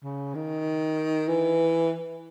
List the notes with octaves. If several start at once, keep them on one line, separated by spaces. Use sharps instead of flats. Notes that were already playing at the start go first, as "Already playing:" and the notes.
C#3
D#3
E3